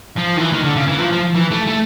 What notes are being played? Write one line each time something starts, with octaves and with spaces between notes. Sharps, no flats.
F3
D#3
E3
D#3
D3
C#3
E3
F3
F3
E3
A3
A3